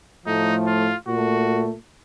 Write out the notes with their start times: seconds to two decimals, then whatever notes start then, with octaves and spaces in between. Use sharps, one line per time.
0.26 A2 F3 A3 D#4
0.67 F4
1.07 A#2 A3 F#4